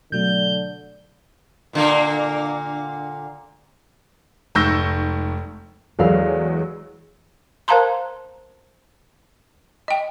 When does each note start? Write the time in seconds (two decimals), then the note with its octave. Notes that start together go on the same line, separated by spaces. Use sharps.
0.12 B2 D3 F#3 A3 G6
1.73 A#2 D3 A#3
4.55 F1 G#2 C#6 E6 G6 A#6
5.99 E2 F#3 G#3 A4 D5 F5
7.68 A#4 C5 F5 A5 A#5 C6
9.88 D#5 G5